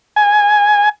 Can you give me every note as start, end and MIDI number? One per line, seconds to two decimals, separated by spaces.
0.16 0.89 80